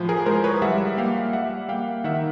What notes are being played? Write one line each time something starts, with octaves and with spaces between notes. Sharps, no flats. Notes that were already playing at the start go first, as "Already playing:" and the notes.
Already playing: A2 F3
G#4 A#4
G#3 A#4 C5
B4 C#5
G3 E5 F#5
A#3 F5 G5
G3 E5 F#5
A#3 F5 G5
D#3 E5 F#5